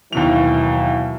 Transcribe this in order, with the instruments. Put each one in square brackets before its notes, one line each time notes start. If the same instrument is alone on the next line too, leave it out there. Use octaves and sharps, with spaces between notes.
[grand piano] D#2 B2 F7 [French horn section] E3 F#3 E4